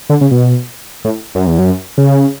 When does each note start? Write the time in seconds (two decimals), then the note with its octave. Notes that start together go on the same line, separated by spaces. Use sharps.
0.10 D3
0.21 C#3
0.31 B2
1.05 A2
1.35 F#2
1.47 E2
1.59 F#2
1.98 C#3